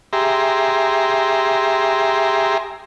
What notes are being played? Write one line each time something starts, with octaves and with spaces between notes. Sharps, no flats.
G4 G#4 E5 A#5 C6